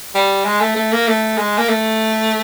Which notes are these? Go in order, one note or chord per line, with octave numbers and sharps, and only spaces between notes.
G3
G#3
A3
A3
A#3
A3
G#3
A#3
A3